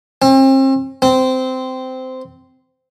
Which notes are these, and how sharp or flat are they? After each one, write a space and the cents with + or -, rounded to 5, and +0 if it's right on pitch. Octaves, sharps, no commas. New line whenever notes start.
C4 +40
C4 -15